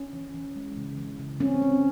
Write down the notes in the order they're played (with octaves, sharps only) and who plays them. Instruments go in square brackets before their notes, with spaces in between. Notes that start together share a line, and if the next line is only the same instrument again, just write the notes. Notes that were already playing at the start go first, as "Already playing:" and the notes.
Already playing: [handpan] C#4
E3
E3
G#3
C#3
E3
C#3
C4 C#4
C4